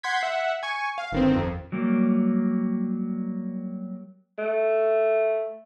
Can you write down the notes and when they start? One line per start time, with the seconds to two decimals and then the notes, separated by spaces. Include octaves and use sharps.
0.03 F#5 C6 G6 G#6 B6
0.23 E5 F#5
0.63 G#5 C#6
0.98 F5
1.12 G1 D#3 C4
1.36 F2
1.72 F#3 G3 A#3
4.38 A3